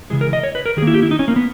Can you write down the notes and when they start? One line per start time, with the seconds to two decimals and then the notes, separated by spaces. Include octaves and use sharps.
0.10 C#3 E3 G#3 G#4
0.21 A#4
0.33 D#5
0.43 C#5
0.55 B4
0.66 A#4
0.77 D#3 G#4
0.82 A#3
0.87 E4
0.94 G4
1.03 E4
1.11 D#4
1.19 C#4
1.28 A#3
1.36 B3